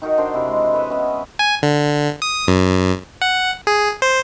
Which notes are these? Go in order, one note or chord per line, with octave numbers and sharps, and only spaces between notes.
D#3 D#4 F#4 A#4
D4 A#4 C5
C3 E4
G#3
B4 C#5 D#5 E5
B3 C#4
G#5
D3
D#6
F#2
F#5
G#4
C5